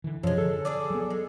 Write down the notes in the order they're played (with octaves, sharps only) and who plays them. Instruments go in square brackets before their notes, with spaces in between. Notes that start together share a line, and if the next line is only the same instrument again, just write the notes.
[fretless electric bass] D3 E3
[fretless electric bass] F#2 C3 [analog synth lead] F3 [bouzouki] F#3 G#3
[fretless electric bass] D3 [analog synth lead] A4
[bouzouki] D4 G#4 D5
[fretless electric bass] F#3 B3
[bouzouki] G#3